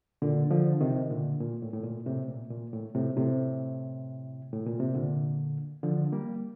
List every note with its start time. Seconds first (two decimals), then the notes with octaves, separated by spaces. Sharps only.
0.22 A#2 D3
0.51 D3 F3
0.81 C3 D#3
1.10 A#2 D3
1.40 A#2
1.62 A2
1.73 A2
1.84 A#2
2.06 A2 C3
2.28 A#2
2.51 A#2
2.73 A2
2.95 A2 C3
3.17 A2 C3
4.52 A2
4.66 A#2
4.80 C3
4.94 A#2 D3
5.83 D3 F3
6.12 G3 A#3